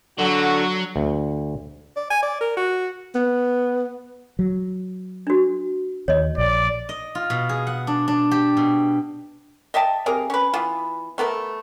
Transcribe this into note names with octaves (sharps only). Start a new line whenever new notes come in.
D3 F#3 F#4
D2
D5
G#5
D5
A#4
F#4
B3
F#3
D4 F#4
D#2 C#5 D#5
A#1 D5
D#5
F4
B2
G#4
F#5
D4
D4
G4
B2
D#5 E5 G5 A5
C3 G#4 A#4 A#5
C#4 B4
E3 B3 F4
A3 B3 A#4 E5